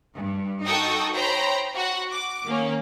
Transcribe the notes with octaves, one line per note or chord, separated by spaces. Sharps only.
G2
D#4 F#4 A4 G5 C#6 D#6
C5 C#5 G5 A#5 B5
F#4 F#5
D6
D#3 A#3 C#4